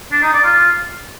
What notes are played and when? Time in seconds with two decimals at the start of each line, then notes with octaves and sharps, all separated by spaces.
0.12 D4
0.22 D#4
0.33 D5
0.44 F4